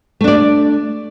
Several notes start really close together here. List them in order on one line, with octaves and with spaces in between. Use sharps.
A3 D4 D5